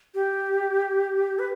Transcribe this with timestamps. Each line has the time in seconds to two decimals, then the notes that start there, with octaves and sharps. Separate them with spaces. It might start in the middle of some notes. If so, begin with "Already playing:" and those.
0.15 G4
1.39 B4